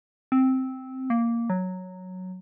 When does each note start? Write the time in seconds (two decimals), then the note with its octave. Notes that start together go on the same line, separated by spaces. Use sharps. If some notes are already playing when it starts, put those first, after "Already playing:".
0.32 C4
1.10 A#3
1.50 F#3